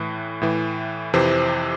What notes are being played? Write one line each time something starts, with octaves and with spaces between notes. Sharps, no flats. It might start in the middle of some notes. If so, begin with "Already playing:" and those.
Already playing: A2 E3
A2 E3
F2 C3 E3 C5